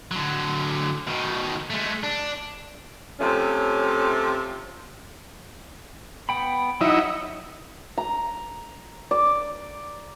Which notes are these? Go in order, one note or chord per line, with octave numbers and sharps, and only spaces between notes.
D3 F#3
B2 D#3
G#3 A3
D4
C3 F3 A3 C#4
B3 G5 B5
F#3 D#4 E4 F#5
A#5
D5